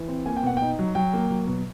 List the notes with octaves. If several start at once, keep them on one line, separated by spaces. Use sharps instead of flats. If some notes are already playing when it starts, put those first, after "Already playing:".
Already playing: E3
C4
A#3 G#5
G5
B2 F#5
D#4 G5
F#3
F#3 G5
A#3
F#3
B2